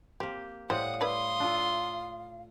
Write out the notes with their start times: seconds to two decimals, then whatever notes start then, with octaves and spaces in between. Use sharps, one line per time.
0.20 A#3 C4 G4
0.70 A2 G3 G4 C5 F5 F#5 D#6
1.01 E4 B4 D5 C6 D#6
1.40 D4 F4 A4